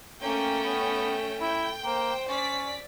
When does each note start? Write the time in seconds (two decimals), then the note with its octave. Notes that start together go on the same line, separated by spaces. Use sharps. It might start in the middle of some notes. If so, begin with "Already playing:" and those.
0.23 A3 A#3 C#4 G5
0.63 B3
1.41 E4 G5
1.84 A#3 C5
2.29 C#4 D5 B6